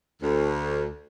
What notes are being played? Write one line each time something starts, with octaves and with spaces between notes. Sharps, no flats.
D2